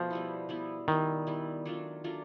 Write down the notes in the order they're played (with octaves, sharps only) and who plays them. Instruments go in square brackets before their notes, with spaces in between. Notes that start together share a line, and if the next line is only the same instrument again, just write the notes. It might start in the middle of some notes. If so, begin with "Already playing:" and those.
Already playing: [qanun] B2 A3 [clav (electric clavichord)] F3
[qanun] G3 B3 E4
G3 B3 E4
[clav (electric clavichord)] D#3 [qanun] G3 B3 E4
[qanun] G3 B3 E4
F#3 A3 D4 F4
F#3 A3 D4 F4